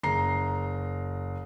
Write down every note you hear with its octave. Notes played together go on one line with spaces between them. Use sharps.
F#1 A#5 C7